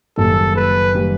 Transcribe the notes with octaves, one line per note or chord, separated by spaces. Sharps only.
F#1 F#2 D#3 G3 A#3 A4
B4
D#3 G3 A#3